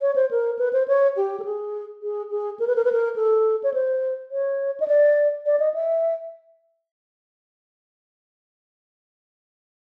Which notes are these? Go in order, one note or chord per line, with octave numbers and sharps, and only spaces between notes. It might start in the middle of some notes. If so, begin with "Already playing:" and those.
C#5
C5
A#4
B4
C5
C#5
G4
A4
G#4
G#4
G#4
A#4
B4
A#4
B4
A#4
A4
C#5
C5
C#5
D#5
D5
D5
D#5
E5